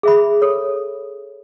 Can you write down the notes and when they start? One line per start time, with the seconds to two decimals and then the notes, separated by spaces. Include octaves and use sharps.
0.03 G#4 E5 B5
0.42 A4 C#5